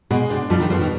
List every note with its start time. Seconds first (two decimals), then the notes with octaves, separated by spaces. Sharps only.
0.10 B2 G#3
0.30 C3 D4
0.50 F2 F3 G3
0.60 D#2 D#3
0.70 F2 B2 F3
0.81 D#3